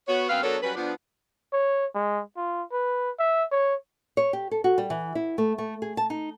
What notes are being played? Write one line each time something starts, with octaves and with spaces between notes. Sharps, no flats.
B3 F#4 C#5
F#2 B3 C4 B4 F5
F#3 B3 D4 A4 A#4 C#5
F#3 G3 C#4 B4
F3 B3 D4
C#5
G#3
F4
B4
E5
C#5
C#5
G4
A4
F#4
G3
E3
E4
A3
A3
G#4
A5
D#4